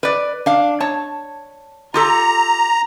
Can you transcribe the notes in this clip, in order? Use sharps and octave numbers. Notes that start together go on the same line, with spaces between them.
B4 D5
D4 F5
C#5 A5
F4 G4 A4 A#5